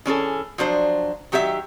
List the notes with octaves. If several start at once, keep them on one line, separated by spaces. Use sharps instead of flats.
E3 C#4 G#4 A4
F3 F#3 D4 C5
D#3 F#3 G4 A4 E5